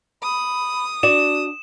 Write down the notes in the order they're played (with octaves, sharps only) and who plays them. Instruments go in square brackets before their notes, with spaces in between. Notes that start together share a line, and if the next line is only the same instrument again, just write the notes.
[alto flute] B5 [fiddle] D#6
[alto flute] D4 [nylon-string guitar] F#4 D5 [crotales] E7